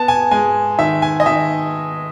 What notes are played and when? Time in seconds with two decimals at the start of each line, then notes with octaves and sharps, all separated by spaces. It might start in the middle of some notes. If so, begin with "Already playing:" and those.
Already playing: B3 A5
0.08 G#5
0.31 G#3 G#5
0.79 D#3 E5
1.02 G#5
1.20 D#5
1.26 D#3 E5